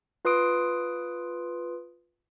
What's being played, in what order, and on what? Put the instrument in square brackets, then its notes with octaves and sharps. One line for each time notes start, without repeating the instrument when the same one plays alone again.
[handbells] F4 B4 C6 D#6 D7